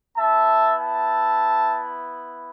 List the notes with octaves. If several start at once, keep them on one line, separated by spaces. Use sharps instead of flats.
B3 E4 E5 A5
E5 A5